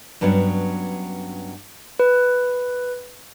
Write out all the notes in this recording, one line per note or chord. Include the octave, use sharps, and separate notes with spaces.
G2 F#3 B3 C#4 D4
B4